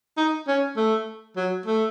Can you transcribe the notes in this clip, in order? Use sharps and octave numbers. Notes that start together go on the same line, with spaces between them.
D#4
C#4
A3
F#3
A3